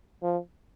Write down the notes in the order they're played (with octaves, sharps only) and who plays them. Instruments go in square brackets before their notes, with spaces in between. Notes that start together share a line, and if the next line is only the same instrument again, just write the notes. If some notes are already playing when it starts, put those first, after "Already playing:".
[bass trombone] F3